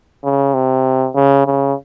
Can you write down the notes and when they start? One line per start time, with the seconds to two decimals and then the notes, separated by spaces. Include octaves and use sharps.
0.24 C#3
0.54 C3
1.15 C#3
1.46 C#3